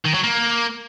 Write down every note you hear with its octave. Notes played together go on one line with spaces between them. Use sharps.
D#3
F#3
A#3